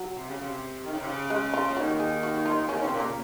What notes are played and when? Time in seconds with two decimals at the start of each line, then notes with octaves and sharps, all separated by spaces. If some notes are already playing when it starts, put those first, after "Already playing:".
Already playing: F#3
0.15 C3
0.28 C#3
0.41 C3
0.85 D#3
0.92 C#3
1.00 C3
1.07 C#3
1.30 G#3
1.54 F4
1.76 D#2 D#3 F#4
2.00 G#4
2.23 F#4
2.45 F4
2.69 C#3 C#4
2.75 D#3
2.81 C#3 C4
2.92 A#2
3.00 A#3
3.04 C#3